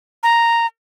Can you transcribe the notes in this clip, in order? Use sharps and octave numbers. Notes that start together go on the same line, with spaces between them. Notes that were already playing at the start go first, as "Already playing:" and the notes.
A#5